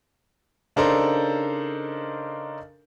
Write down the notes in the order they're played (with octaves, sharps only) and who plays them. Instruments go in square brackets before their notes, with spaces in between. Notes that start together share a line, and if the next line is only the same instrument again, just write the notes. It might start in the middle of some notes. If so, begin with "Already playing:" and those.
[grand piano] C#3 D4 D#4 A4 A#4 C5